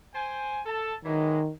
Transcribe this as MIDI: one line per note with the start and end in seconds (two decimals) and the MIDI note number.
0.14 0.61 72
0.14 0.61 79
0.14 0.61 80
0.66 0.94 69
0.66 0.94 81
1.05 1.52 51
1.05 1.40 52
1.05 1.40 54
1.05 1.40 56